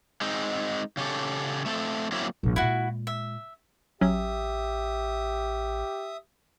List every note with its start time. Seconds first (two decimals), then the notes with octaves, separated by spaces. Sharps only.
0.21 G#3 C4 D#4
0.97 C#3 C#4 G4 A4
1.66 A3 C4 A4
2.12 F#3 A#3 C4 C#4 E4
2.43 A#1 G2
2.56 A#2 G#3 E4 F#4
3.07 E5
4.01 A1 F#3 C#4 G4 E5 D#6